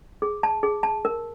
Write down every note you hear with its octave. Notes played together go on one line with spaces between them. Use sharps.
G#4
A5
G#4
A5
A#4